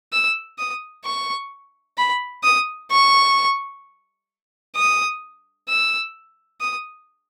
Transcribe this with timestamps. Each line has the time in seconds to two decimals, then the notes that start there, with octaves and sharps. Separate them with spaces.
0.13 E6
0.58 D#6
1.05 C#6
1.98 B5
2.43 D#6
2.91 C#6
4.76 D#6
5.69 E6
6.61 D#6